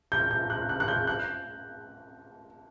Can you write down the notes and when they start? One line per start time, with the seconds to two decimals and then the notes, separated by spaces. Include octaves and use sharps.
0.12 G6
0.31 G6
0.50 F#6
0.69 F#6
0.80 F#6
0.88 G6
1.07 F#6